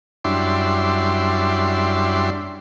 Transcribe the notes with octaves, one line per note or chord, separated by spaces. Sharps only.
F#2 G3 D4 E4 C6